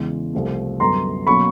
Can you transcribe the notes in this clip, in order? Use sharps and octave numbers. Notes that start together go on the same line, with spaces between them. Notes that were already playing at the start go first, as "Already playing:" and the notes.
Already playing: E2 C#3 E3 G#3
C2 C3 F3 A3
F#2 D3 G3 B3 A#5 C6
B2 F#3 A#3 C#4 B5 C#6